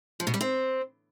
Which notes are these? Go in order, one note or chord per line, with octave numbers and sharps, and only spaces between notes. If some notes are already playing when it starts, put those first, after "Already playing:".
F3
B2
G3
C4